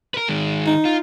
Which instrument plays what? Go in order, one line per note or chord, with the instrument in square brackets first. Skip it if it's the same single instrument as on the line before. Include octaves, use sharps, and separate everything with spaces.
[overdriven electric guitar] A#4 B4
D#3 G#3
[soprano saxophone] D#4
[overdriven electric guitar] F4